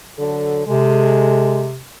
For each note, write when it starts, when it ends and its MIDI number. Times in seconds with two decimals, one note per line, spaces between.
0.18 0.66 50
0.18 0.66 54
0.18 0.66 69
0.67 1.81 48
0.67 1.67 56
0.67 1.67 69